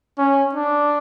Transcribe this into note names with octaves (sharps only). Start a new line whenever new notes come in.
C#4
D4